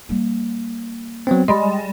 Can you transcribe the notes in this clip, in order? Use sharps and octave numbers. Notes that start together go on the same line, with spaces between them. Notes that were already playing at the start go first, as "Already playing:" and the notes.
G3 A#3
F#3 B3 C4
G3 G#3 D#5